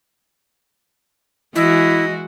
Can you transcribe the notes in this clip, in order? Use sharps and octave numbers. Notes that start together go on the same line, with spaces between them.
E3 G#3 E4 F#4 D#5